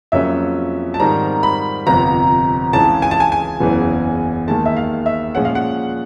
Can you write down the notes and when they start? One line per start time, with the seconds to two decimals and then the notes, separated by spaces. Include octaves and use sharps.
0.12 F2 C#3 F#3 A#3 C#4 E5
0.94 A5
1.00 G#2 D#3 G3 C4 A#5
1.43 B5
1.87 G1 F2 C3 F3 A#5
2.73 C#2 C#3 E3 G#3 A5
3.02 G#5
3.11 A5
3.20 G#5
3.32 G#5
3.60 F#1 E2 C#3 E3
4.47 D#2 D#3 G#3 A5
4.66 E5
4.77 F5
5.06 E5
5.35 A#2 F3 G#3 C#4 F#5
5.45 F5
5.55 F#5